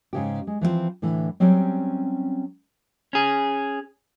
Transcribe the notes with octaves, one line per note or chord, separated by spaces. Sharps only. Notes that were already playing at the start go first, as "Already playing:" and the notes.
G#2 C#3 G4
G#3
E3 F3 A3 C4
A2 D3 E3 E4
F#3 G3 C4 C#4
C#4 G#4